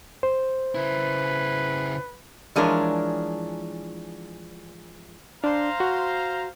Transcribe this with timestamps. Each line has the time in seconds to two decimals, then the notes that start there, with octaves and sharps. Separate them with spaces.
0.23 C5
0.75 C#3 E4 B4
2.56 E3 F3 G#3 D4 A#4 C#5
5.44 D4 C5 F5 A#5
5.80 F#4